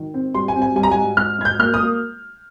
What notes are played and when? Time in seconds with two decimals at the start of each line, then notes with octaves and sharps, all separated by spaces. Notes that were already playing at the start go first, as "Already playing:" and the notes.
Already playing: D#3
0.14 C4
0.34 G3 C6
0.48 G#5
0.56 C4
0.62 G#5
0.76 G3 G#5
0.83 A#5
0.91 G#5
0.97 G#2
1.17 G#2 F6
1.38 G#2 G#6
1.45 G6
1.59 A#3 F6
1.74 D#6
1.80 A#3